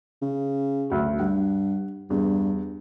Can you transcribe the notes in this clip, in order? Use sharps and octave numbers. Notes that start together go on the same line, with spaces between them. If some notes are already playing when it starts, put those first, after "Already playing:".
C#3
D2 F#3
G2 F#5
E2 G2